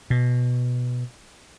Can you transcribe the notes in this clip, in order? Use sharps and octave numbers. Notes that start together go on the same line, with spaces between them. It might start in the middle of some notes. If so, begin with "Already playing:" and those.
B2